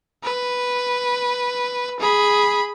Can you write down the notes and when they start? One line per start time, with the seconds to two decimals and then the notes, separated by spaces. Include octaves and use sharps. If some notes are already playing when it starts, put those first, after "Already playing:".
0.24 B4
2.00 G#4 B5